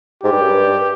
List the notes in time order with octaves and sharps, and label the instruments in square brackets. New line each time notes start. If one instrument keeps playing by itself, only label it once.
[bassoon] G#2 [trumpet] G4
[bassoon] G2
F#2
G2